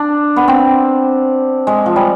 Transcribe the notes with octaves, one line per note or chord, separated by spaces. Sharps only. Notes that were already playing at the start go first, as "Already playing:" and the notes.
Already playing: D4
B3
C4
G#3
F3
G3